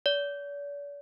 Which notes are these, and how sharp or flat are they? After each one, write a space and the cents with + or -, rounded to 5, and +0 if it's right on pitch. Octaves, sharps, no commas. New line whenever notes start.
D5 -45